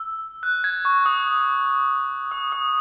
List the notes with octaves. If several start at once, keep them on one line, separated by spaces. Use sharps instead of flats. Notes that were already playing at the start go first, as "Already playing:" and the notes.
Already playing: E6
F#6
G#6
C#6
D#6
D#6
D#6